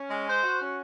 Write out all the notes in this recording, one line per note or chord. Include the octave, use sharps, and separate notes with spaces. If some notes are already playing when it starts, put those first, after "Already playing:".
Already playing: C#4
G#3
C5
F#4
C#4